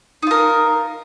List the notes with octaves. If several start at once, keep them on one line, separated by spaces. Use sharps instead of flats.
D#4 F4 A#4